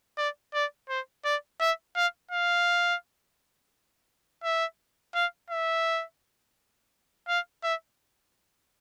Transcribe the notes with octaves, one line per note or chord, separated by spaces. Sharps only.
D5
D5
C5
D5
E5
F5
F5
E5
F5
E5
F5
E5